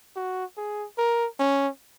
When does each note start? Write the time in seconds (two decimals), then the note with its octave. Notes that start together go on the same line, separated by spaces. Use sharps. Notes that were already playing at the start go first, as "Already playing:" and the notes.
0.16 F#4
0.57 G#4
0.98 A#4
1.39 C#4